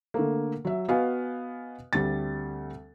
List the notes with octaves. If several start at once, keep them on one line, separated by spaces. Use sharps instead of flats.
D3 A3 A#3
F#3 E5
B3 F#4 D#5 F5 G#5
D2 G3 C4 A6